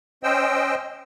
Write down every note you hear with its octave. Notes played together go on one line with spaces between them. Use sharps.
C#4 C5 D#5 G5 E6